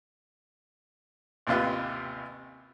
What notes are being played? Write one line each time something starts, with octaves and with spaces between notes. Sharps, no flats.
A1 D#2 C3 F4 B4